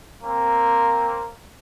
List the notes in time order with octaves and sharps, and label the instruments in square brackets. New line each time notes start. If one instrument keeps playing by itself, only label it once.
[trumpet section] A#3 C4